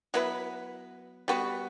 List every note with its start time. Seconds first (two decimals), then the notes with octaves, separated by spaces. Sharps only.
0.14 F#3 B3 E4 B4
1.28 G3 B3 F#4 B4